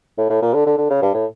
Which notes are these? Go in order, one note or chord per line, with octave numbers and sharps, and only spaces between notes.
A2
A2
A#2
D3
D3
D3
C#3
G2
A2